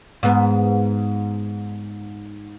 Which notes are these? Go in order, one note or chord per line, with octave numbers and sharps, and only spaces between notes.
G#2 B3